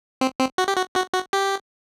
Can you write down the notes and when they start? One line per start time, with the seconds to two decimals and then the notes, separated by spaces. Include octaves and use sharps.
0.21 C4
0.39 C4
0.58 F#4
0.68 G4
0.77 F#4
0.96 F#4
1.14 F#4
1.33 G4